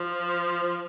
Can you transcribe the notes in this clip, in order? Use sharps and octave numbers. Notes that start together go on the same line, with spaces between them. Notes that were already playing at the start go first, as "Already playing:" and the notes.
Already playing: F3
F3